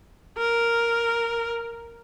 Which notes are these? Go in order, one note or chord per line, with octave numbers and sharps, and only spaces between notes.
A#4